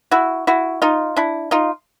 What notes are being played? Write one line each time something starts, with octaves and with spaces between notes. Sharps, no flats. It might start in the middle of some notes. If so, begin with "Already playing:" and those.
E4 F#4
E4 F#4
D#4 F4
D4 E4
D#4 F4